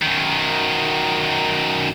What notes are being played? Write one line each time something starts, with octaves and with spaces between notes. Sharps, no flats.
F#2 D#3